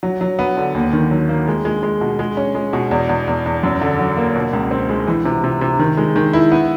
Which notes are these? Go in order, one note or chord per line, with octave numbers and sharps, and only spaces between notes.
F#3
F#3
B3
D3
D#2
D#3
F#3
A#3
G#3
G#3
G#3
B2
G#3
C#4
G#3
B2
E2
E2
E2
E2
F#2
D3
F#3
A#3
B2
C#2
C4
G#3
E3
C3
C3
C3
D#3
G#3
D#3
E4
B3